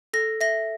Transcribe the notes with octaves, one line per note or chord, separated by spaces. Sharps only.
A4 A#6
E5 A#6